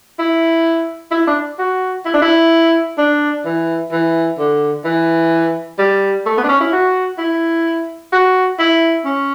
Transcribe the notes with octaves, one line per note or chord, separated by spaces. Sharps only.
E4
E4
D4
F#4
E4
D4
E4
D4
E3
E3
D3
E3
G3
A3
B3
D4
C#4
E4
F#4
E4
F#4
E4
C#4